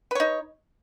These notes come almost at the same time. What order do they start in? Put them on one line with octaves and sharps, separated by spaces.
B4 C#5 D#4